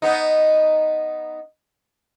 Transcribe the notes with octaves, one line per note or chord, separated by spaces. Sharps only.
B3 D#4